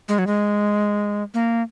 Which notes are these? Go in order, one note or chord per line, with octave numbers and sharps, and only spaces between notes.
G#3
F#3
G#3
A#3